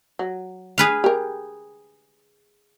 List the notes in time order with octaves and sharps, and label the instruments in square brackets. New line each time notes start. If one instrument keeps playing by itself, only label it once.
[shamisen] F#3
[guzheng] G#4 B4 F5
[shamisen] G4 A#4